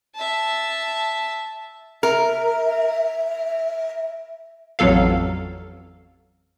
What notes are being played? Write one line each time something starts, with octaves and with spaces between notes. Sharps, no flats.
E5 A5
A#4 E5
A1 F2 F#3 A4 F5